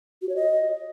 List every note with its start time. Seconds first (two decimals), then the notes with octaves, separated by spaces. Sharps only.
0.22 F#4
0.29 C#5
0.36 D#5